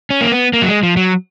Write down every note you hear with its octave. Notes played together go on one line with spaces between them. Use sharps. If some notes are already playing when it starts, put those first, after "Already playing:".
C#4
A#3
B3
A#3
F#3
G#3
F3
F#3